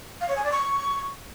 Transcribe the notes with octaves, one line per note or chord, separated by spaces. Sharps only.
F5
C#5
G#5
D5
C#6